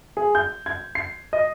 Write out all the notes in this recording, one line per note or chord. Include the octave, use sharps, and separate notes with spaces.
G#4
G6
G#6
C7
D#5